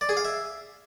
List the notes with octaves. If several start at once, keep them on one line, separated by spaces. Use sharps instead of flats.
D5
G#4
F5
E5